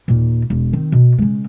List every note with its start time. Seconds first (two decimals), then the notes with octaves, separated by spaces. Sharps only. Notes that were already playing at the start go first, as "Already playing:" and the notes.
0.08 D#2 A#2
0.50 E1
0.73 D#3 C4
0.92 B2
1.18 C#3 G#3